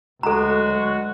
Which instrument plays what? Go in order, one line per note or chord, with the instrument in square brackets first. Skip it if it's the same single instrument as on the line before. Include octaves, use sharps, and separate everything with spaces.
[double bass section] D2 F#3 [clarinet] G#3 [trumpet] F#4 [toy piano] A4 A#5